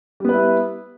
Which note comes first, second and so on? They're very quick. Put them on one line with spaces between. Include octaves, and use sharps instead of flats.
G3 B3 B4 E4